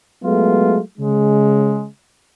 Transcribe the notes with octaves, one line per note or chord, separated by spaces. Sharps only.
F#3 G#3 A3 B3 F4
C#3 G#3